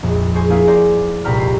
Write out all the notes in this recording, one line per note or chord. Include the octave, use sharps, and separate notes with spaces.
A#1 F2
G#4 C5 C#5 G#5
A#3 E4 G#4 B4 F5
A#4 C5 D5
C2 A#2 G5 A#5 B5 F6
F1 C7